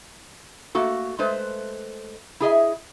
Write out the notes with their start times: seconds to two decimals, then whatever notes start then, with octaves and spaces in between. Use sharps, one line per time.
0.75 A3 A#3 F#4 A4
1.19 G#3 A3 B4 C5
2.40 E4 G#4 D#5 E5